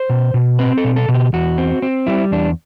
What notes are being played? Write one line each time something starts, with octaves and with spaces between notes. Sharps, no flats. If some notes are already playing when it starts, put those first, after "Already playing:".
Already playing: C5
B2
B2
C4 B4
A4
B2
A4
B2
G4
E2 F#4
C4
C4
G3 E4
E2 D4